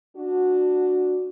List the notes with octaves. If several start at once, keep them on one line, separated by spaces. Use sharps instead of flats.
D4 F#4